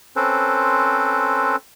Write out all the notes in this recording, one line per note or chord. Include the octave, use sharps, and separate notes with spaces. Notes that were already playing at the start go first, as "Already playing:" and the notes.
C4 C#4 A4 B4 C5